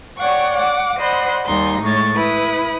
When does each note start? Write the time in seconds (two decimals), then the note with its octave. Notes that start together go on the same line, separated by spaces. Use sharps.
0.17 C#5 D5 F#5 G5 C#6
0.56 F#5 D6
0.98 C5 D5 D#5 F#5 B5 C6
1.46 D#2 G3 D#4 C6
1.81 A2 G#3 C#5 C#6 A6
2.15 E4 B4 B5 D#6